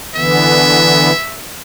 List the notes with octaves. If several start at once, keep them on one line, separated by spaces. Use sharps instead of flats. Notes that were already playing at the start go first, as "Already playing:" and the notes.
D3 E3 B3 E5